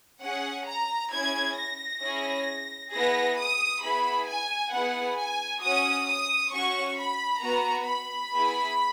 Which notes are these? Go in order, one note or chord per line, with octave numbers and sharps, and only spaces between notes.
C#4 G#4 F#5
A#5
C#4 E4 G#4 G#6
A#6
C#4 E4 G#4
B3 E4 G#4 A#6
D#6
B3 E4 G#4 B5
G#5
B3 E4 G#4 F#5
G#5
C#4 F#4 D#6
D#6
C#4 F#4 C#6
B5
B3 F#4 A#5
B5
B3 E4 G#4